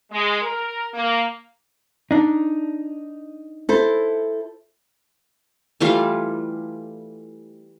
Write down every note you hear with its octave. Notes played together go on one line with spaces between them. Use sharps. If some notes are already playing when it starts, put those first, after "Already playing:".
G#3
A#4
A#3
D4 D#4
E4 A4 C5
E3 G3 A3 F4